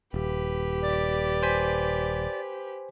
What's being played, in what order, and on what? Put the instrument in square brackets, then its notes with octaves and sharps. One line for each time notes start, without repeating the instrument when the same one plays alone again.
[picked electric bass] D#1 [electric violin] G4 B4
[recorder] D5
[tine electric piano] C5 G#5 B6